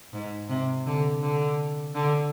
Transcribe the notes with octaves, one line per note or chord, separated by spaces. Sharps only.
G#2
C3
D3
D3
D3